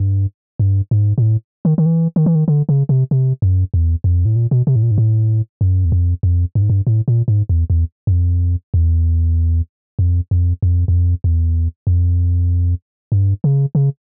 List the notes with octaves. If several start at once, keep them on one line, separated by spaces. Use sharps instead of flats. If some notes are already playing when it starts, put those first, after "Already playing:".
Already playing: G2
G2
G#2
A#2
A2
D#3
D#3
E3
D#3
E3
D#3
D3
C#3
C3
C3
F#2
E2
F2
A2
A#2
B2
C3
A2
A#2
G#2
A2
F#2
E2
F2
F2
G2
G#2
G2
A2
A#2
G#2
E2
E2
F#2
F2
E2
F2
F2
F2
E2
F2
E2
F2
G2
C#3
C#3